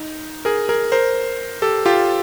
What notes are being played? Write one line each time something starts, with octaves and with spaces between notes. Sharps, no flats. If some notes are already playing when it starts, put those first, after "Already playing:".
Already playing: D#4
G#4 A#4
G#4 A#4
A#4 C5
G4 A4
F4 G4